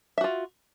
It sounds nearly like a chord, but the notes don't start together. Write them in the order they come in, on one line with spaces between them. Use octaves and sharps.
E5 F#4 F4